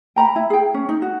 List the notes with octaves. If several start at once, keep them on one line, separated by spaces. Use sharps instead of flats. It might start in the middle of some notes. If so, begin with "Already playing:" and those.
G5 A#5 B5
E4
G#4 G5
C#4
D#4
F#4